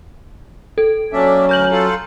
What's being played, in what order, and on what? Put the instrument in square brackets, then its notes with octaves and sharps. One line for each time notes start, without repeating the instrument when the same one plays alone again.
[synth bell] A4
[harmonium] F#3 C#4 [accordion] A#3 D4 E5
[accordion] D2 A#4 [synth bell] A#5 G6 F#7
[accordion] F4 A4